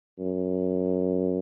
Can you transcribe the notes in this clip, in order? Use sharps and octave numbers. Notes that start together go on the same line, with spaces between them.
F#2